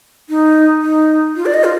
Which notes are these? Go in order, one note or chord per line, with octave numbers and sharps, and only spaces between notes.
D#4
D#4
F4
D5
D#5
F4